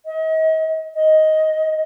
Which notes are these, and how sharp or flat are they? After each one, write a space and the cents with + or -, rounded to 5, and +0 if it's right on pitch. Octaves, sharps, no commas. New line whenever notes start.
D#5 +40
D#5 +10